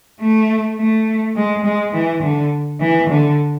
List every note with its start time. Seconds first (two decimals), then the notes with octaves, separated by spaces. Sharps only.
0.20 A3
0.78 A3
1.36 G#3
1.65 G#3
1.93 E3
2.23 D3
2.80 E3
3.09 D3